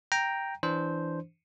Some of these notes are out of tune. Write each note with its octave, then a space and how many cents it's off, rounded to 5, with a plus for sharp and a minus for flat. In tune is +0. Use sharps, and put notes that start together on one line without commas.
G5 +0 A#5 +0
E3 +0 D4 -10 C5 +0